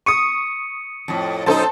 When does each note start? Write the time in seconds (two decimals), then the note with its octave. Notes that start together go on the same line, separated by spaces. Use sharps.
0.06 C#6 D#6 C#7 D#7
1.08 F2 A2
1.46 F#2 B2 D#4 A4 C5 A5